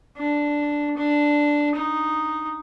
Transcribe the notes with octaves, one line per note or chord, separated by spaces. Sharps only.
D4
D4
D#4